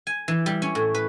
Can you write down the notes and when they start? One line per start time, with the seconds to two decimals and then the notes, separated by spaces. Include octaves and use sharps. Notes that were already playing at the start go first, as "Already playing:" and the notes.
0.07 G#5
0.28 E3
0.46 G3
0.62 C#4
0.75 A2
0.95 B4